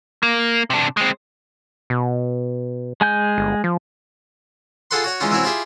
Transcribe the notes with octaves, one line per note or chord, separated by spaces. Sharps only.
A#3
C3 D4
G#3 C4
B2
G#3 G#5 G6
G1
F3
F4 G#4 A4 B4 F#5 C6
F#4 C#5 F#5
E3 G#3 C#4 D#4 F4
E3 F#3 C4 C#4 E4 C#5
E4 F4 G4 G#4 E5